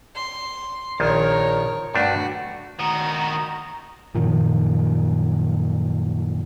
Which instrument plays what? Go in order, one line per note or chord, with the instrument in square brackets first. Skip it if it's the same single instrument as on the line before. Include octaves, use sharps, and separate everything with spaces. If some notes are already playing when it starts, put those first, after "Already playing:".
[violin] C6
[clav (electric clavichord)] A#1 D#3 F3 [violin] A#4 C#5
[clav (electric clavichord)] G2 A3 D4 [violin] F#4
[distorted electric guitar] D#3 F#4 [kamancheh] A#5 [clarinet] D#6
[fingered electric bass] F#2 A#2 D#3 F3